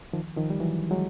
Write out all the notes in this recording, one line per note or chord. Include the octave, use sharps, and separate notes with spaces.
D#3 F3
D#3 F3
G3
E3 F#3
F#3 G#3